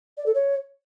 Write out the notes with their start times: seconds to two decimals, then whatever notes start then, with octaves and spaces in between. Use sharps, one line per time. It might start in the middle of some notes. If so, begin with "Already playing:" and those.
0.18 D5
0.26 A4
0.35 C#5